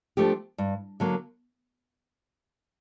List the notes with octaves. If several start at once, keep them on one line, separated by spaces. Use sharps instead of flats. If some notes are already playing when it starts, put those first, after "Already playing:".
F3 A3 D4 G4
G2
D3 F#3 A#3